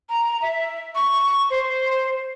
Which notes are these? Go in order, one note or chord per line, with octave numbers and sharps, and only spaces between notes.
A#5
E5
C#6
C5